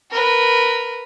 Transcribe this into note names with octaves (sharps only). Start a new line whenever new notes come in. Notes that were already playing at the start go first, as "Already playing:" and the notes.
A#4 B4